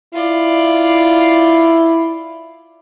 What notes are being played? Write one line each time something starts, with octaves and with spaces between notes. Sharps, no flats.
E4 F4 D5